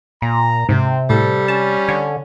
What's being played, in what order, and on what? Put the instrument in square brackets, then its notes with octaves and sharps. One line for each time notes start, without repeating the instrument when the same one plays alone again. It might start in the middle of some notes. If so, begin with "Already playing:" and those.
[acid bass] A#2 [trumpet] A#5
[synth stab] G#2 [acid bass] C3 [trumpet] C4
[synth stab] A2 [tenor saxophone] G3 [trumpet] A4
[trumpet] C#4 [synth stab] A5
[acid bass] D3 [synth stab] C#5